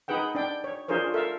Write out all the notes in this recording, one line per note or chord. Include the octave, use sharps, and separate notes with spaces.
D#4 G#4 B4 F#5 G5
D4 D5 G5
C#5
D4 F4 G#4 A#4 C5 C#5
A4 A#4 E5 F5